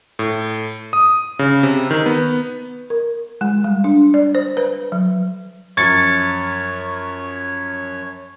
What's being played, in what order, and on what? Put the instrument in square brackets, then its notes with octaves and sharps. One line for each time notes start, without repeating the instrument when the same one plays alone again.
[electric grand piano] A2
D#6
C#3
C3
D#3
B3
[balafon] A#4
G#3
G3
D4
D5
C5
B4
F#3
[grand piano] F#2 F3 [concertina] C#5 [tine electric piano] C#6 A6 [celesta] G#6 C#7